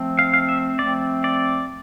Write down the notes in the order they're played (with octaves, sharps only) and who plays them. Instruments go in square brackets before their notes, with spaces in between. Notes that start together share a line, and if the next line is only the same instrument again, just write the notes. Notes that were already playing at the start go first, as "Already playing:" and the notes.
Already playing: [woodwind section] F3 A3 C4
[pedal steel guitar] F5
F5
E5
[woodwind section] F3 A3 C4 [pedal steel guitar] D5
[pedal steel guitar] D5